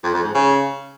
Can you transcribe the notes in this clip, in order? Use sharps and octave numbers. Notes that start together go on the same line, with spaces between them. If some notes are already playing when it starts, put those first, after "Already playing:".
F2
F2
G#2
C#3